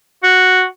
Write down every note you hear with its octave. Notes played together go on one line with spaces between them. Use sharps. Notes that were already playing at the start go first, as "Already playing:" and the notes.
F#4